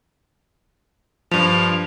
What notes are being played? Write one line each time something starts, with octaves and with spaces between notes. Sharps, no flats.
G2 F3 F7